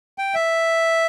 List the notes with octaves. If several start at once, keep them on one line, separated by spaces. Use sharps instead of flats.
G5
E5